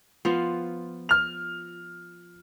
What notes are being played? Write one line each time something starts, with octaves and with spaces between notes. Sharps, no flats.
F3 B3 F4
F6 F7